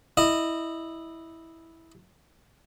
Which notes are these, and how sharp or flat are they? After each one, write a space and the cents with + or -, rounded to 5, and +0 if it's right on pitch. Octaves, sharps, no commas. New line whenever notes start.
E4 -10 D#5 -20